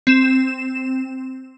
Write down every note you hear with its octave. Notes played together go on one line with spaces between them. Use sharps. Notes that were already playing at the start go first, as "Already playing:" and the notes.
C4 E7